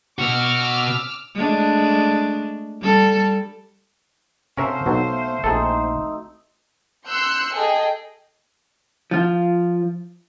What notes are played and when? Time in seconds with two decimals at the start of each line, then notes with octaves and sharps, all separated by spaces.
0.19 B2 F#4 D6 E6 F6
1.34 G#3 A3 D4
2.80 G3 A4
4.57 C3 C#4 F#4 A4 A#4 C5 E5 F5
4.86 B1 F#3 B3
5.11 A3
5.44 A#1 C4 D#4 G#4 A4
7.08 C6 E6 F#6 G6 C#7
7.54 G#4 A4 D#5 G5
9.11 F3 F4